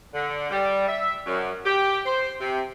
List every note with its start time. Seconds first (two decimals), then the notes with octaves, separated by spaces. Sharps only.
0.14 D3
0.50 G3
0.87 E5
1.27 F#2
1.65 G4
2.06 C5
2.40 C3